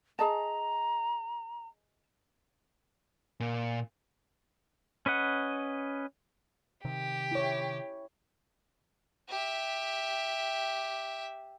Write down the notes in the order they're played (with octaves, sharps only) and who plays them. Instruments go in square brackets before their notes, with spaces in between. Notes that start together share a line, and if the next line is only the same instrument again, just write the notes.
[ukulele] G#4 D#5 A5 [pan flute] A#5
[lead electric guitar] A#2
[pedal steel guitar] C#4 B4 D#5 F#5
[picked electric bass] C3 D#3 [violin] G4
[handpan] E4 C#5
[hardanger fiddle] G4 E5